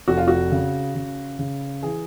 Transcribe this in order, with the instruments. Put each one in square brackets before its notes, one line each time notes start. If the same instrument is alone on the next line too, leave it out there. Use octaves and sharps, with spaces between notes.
[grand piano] F1 [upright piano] F#4
[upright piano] F4
F#4
[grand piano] C#3
C#3
C#3
[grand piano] E3 [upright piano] G#4